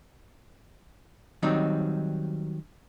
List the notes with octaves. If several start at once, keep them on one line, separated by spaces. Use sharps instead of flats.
D#3 F#3 G3 C4 D#4